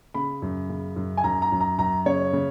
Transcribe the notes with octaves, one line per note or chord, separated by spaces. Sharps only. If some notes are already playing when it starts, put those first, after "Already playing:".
C#3 B5
F#2
C#3
F#2
G#5
F#2 A#5
A#5
F#2
A#5
F#2 A#5
C#3 C#5
C#3